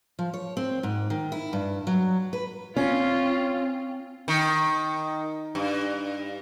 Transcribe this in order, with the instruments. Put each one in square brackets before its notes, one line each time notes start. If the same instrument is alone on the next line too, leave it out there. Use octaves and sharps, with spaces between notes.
[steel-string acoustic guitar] F3
C#5
C4
G#2
D#3
E4
G2
F#3
B4
[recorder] C4 [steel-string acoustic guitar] C#4 [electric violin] F4
[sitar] D#3
G2